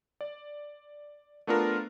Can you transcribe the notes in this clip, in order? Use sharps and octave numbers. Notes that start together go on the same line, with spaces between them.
D5
A3 B3 D4 F4 A#4